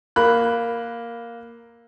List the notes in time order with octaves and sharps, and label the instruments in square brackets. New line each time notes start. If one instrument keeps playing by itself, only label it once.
[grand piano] A#3 B5 F#6